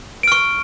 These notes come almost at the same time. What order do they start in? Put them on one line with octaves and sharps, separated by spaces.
D7 F6 C#6